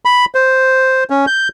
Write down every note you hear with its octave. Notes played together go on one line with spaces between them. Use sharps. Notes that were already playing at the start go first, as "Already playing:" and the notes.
B5
C5
C#4
G6